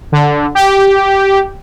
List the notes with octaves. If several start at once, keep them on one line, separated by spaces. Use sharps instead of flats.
D3
G4